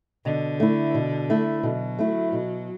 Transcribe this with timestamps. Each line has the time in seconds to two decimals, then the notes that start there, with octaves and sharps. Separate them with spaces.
0.25 B2 D3
0.60 A3 E4
0.95 B2
1.30 A3 E4
1.63 B2 F#3
1.99 A3 E4
2.32 B2